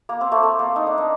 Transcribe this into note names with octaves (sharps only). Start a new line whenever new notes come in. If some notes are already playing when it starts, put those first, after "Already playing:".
A#3
C4
A3
A3
A#3
D#4
D4
D#4